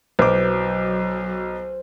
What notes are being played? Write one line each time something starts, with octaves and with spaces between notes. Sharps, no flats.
B1 F#3 C5 D6